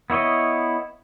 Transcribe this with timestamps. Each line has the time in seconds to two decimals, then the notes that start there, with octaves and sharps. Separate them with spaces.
0.10 B3 E4 C#5 D#5